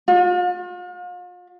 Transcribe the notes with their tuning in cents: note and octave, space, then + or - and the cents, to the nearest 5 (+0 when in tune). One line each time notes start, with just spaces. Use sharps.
F4 +40